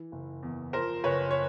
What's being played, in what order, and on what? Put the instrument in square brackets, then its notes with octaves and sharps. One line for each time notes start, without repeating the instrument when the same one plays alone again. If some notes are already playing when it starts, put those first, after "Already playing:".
Already playing: [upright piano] E3
F#1
E2
F3 A#4 C5
F#1 B4 C#5
C#5